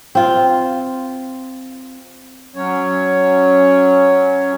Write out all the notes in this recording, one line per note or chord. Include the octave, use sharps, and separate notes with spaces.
C4 F4
F#3 C#4 C#5